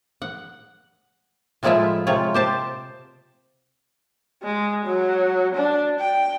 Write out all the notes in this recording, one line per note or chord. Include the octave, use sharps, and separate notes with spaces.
F#5
A2 F3 G#3 E4 F4 E5
C3 G#3 F4 C#5
G4 C5 A5
G#3
F#3
D4
G5